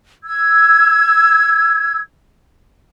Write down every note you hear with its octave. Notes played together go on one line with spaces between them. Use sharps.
E6 G#6